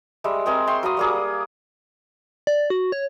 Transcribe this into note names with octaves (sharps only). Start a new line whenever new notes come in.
G3 G#3 E5
G#3 C4 G#4 A#4
E5 G5 C6 C#6
F#3 F5 B5 D#6
G3 A#3 G#4
D5
F#4
C#5